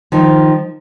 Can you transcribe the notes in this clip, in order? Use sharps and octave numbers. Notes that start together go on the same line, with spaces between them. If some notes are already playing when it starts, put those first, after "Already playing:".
D#3 F3